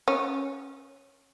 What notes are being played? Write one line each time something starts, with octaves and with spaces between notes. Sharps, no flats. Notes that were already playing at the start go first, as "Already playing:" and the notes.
C#4